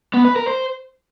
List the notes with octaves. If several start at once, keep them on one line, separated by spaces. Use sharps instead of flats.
B3
B4
A#4
C5